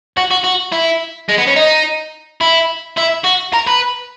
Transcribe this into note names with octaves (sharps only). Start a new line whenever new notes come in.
F#4
F#4
F#4
E4
G#3
B3
C#4
D#4
E4
E4
F#4
A#4
B4